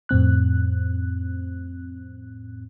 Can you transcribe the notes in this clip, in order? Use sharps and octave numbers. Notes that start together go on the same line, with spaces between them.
F2 A2 C4 F#6